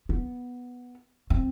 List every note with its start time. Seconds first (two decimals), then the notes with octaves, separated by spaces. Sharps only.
0.09 B3
1.30 C4